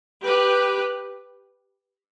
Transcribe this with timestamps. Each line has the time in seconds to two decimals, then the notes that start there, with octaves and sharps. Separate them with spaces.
0.24 G4 B4